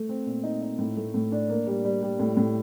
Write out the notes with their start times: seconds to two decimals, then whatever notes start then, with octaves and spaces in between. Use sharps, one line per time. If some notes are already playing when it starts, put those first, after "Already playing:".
Already playing: A3
0.09 C4
0.26 A#2
0.43 D#4
0.62 D#4
0.79 A2
0.97 A3
1.14 A2
1.32 D4
1.49 A#3
1.67 G3
1.85 G3
2.02 G3
2.19 A2
2.37 A2